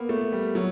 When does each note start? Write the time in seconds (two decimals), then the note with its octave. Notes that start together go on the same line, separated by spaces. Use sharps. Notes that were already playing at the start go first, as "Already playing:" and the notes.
Already playing: A#3 B3
0.09 A3
0.32 G3
0.55 F#3